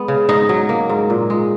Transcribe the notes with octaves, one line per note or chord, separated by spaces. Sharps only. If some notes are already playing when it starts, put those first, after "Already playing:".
Already playing: G#3 B3
C#3
G#2 D#4
F#3
A#3
G#2
A#2
G#3